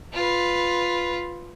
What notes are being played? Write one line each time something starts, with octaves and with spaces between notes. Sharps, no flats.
F4 B4